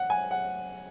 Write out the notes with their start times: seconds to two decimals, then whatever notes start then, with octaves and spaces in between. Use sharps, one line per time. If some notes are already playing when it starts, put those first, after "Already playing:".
Already playing: F#5
0.10 G#5
0.31 F#5